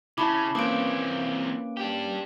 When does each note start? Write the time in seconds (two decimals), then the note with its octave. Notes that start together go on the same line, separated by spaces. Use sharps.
0.18 C#3 C#4 E4 A5 B5 D6
0.55 E3 A#3 C4 C#4 B4 D6 D7
1.77 D4 G4